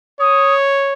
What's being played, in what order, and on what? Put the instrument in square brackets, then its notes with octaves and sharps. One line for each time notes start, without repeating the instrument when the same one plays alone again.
[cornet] C#5 [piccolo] D#6